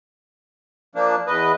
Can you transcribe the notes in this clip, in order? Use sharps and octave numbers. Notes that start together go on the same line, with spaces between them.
F3 A#3 D4
E2 B4 D#5